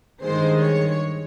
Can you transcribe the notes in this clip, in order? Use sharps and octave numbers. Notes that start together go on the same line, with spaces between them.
G2 D#3 G#3 C5
C#5